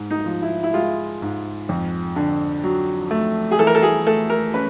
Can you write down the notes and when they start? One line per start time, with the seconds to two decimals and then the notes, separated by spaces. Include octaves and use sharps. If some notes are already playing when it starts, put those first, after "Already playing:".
Already playing: G#2
0.11 D#4
0.26 F3
0.42 E4
0.63 E4
0.73 G#3 F4
1.22 G#2
1.69 F2
2.16 D3
2.64 F#3
3.11 A3
3.51 G#4
3.59 E3 A4
3.67 A#4
3.75 A4
3.82 G#4
4.07 A3 A4
4.30 A#4
4.54 C#4 B4